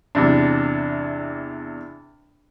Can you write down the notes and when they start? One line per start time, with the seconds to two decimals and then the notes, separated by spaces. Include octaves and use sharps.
0.15 E2 C3 D4